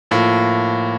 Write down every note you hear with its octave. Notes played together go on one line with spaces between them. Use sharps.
A2 F3 A#3